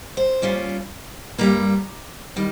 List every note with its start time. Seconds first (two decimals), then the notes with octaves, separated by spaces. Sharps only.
0.17 C5
0.42 A#2 G3 C#4 F4
1.38 G2 G3 A#3 A#5
2.36 D#3 G3